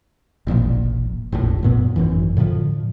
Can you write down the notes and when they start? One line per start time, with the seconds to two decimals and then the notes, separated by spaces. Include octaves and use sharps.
0.47 E1 A1 A#2 F3
1.32 F1 A#1 A2
1.63 F#2 A#2 B3
1.96 G#1 F#2 E3
2.37 A2 D3 D#3 F3